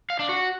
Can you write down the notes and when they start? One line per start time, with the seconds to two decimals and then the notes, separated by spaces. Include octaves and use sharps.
0.10 F5
0.19 D4
0.29 F#4